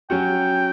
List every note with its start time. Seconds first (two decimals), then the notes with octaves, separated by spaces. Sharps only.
0.10 F#3 C#4 F#4 G5